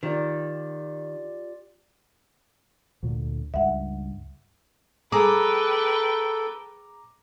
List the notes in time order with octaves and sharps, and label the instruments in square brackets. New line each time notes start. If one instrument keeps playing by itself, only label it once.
[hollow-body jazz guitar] D#3 [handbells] F4 G4 D5
[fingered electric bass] D2 A#2 D3
[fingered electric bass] C#2 G2 [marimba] E5 F#5
[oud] G#4 [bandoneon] A4 [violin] B4 G5 [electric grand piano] A#5 D6